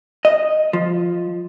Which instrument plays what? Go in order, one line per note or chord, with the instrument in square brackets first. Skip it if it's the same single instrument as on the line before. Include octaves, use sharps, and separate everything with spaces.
[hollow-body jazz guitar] D#5
F3